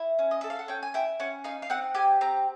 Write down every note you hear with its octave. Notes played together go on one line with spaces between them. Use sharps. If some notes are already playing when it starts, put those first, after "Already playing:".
Already playing: E4
C#4
D#5
A4 E5
F5
F#5
C#4 G5
G#5
E4 G5
C#4 F#5
D#4 F5
F5
C4 F#5
G4 G#5
C4 A#5